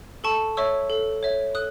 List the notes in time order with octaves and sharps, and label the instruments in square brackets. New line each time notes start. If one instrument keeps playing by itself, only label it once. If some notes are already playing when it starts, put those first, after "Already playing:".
[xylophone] A4 A5 C#6
C#5 E5 C#6 E6
A4
C#5 E5
A4 D#6 F#6